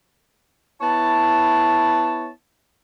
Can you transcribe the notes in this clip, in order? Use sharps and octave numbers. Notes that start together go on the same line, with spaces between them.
B3 E4 C#5 A5